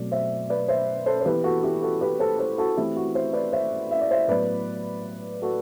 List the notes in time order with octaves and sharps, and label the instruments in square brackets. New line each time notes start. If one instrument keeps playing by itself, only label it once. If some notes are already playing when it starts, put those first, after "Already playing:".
Already playing: [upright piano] B2 F#3 A3 C4 D5
C5 E5
B4 D5
C5 E5
A4 C5
C5
E3 B3 G4 B4
F#4 A4
E4 G4
F#4 A4
G4 B4
A4 C5
A4 C5
F#4 A4
E3 A3 C4 E4 G4
F#4
C5 E5
B4 D5
C5 E5
E5
D5
C5 E5
A2 F#3 B3 B4 D5
F#4 A4